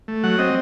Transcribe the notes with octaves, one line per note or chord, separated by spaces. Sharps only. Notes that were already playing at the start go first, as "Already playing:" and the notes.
A3
F#3 F#5
C4 D#5